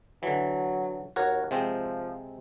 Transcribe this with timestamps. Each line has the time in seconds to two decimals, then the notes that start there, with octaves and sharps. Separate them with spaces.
0.23 D3 E3 F#3
1.16 D#2 F#4 A#4 C#5
1.51 C3 F3 G#3 C4